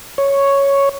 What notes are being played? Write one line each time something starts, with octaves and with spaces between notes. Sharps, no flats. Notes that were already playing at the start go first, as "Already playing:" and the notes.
C#5